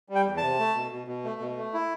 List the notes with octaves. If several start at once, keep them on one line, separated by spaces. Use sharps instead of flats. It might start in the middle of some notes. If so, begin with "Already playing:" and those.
G3
G5
E2
A5
C3
A3
B2
B2
B2
A3
B2
A3
E4